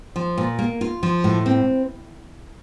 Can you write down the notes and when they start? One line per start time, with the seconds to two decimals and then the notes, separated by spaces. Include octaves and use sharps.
0.16 F3
0.38 A#2
0.59 A#3
0.81 F4
1.03 F3
1.24 A2
1.46 C4